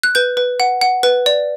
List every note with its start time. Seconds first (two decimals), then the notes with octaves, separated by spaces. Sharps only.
0.03 F#6
0.15 B4 G6
0.37 B4
0.60 F#5
0.81 F#5
1.03 B4
1.26 D5